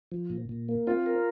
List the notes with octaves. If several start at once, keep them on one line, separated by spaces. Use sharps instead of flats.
F3
A#2
A#2
A#3
C4 F4
A#4